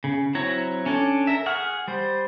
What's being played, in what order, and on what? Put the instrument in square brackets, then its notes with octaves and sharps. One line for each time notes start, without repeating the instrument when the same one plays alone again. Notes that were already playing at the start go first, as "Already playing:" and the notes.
[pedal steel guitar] C#3
F#3 C4 E4 C#5 A#5
C#4 D4 A4 C#5
A#4 E5
G#4 F#5 C#6 F6
G3 C5